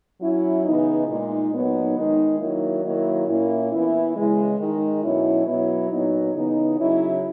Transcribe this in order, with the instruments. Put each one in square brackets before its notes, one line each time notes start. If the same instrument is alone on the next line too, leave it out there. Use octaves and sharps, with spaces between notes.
[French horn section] F#3 C#4 E4
C#3 E3 B3 D#4
A#2 G#3 D#4
A#2 F#3 B3 D#4
D#3 G#3 D#4
D#3 F#3 A#3 E4
D#3 F#3 A#3 E4
A#2 A#3 C#4 E4
E3 B3 E4
C#3 E3 G#3
D#3 G#3 D#4
B2 F#3 C#4 E4
B2 F#3 B3 E4
A#2 F#3 B3 D#4
C#3 E3 B3 D#4
C#3 F#3 C#4 E4